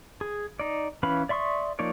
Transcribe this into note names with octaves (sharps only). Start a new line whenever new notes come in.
G#4
D#4 D5
E3 C#4 B4 F5 B5
D5 E5 C6 C#6 D#6
F3 A#3 D#4 C#5 D5